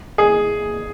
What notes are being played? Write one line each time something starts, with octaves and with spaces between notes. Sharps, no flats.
G#4